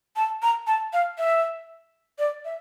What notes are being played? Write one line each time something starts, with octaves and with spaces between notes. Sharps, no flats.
A5
A#5
A5
F5
E5
D5
E5